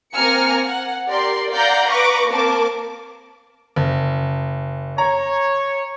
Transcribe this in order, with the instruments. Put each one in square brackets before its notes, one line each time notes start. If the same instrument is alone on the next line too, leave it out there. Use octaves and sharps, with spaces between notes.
[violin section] A#3 C4 G#5 A#5 F6 C#7
F#5
G4 A#4 D5 C6
D5 F5 F#5 A#5 G6
B4 A#5 C#6 D6
A#3 C4 A#4 A5 D6
[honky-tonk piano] F#1
[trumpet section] C#5 [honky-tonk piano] A#5